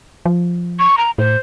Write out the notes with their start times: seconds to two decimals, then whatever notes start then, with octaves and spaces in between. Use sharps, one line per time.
0.25 F3
0.79 C#6
0.98 A#5
1.18 A2 C5